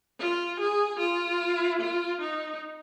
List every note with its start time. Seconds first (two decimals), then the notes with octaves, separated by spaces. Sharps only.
0.20 F4
0.60 G#4
1.00 F4
1.81 F4
2.21 D#4